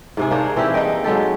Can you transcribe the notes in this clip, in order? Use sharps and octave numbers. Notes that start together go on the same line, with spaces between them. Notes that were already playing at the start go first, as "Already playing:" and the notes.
G#2 C3 G#4
A#3 D4 C5 C#5
E3 C4 E4 G4
D#4 G#4 D#5 G5
F#3 G#3 G4 A4